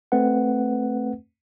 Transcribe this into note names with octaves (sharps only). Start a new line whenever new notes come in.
A3 C4 B4 F#5